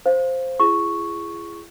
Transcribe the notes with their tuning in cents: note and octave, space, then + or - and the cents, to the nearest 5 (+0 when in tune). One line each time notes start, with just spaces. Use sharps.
C5 +0 F5 +0
E4 +45 G#4 +0 C#6 +0